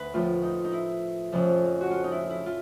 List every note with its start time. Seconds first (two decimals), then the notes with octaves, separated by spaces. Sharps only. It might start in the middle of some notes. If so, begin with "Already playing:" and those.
Already playing: D2 B4
0.13 A2 F3 F4
0.43 D#4
0.64 D#4
0.72 E4
1.32 F2 C#3 F3
1.81 F#4
1.91 F4
2.04 D#4
2.12 E4
2.30 E4
2.46 F4